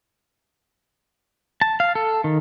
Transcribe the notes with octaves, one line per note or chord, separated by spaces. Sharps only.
A5
F5
A4
D#3